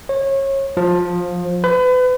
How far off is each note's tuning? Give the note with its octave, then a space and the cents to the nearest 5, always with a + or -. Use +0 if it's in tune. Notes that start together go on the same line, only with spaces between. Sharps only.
C#5 -30
F3 +20
B4 +35